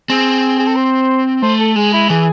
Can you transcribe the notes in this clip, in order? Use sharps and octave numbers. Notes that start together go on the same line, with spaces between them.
C4 G#4
G#4
A4
C5
A3 C5
A4
G#3 G#4
E4
E3 G#4